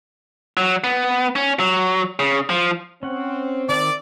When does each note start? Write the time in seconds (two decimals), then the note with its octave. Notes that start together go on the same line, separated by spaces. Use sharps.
0.57 F#3
0.84 B3
1.36 C#4
1.60 F#3
2.19 C#3
2.50 F3
3.03 C4 C#4 F#5
3.69 D#3 D5 E5